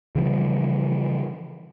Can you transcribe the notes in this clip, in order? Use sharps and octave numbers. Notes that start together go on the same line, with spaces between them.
C#3 E3 F3 G3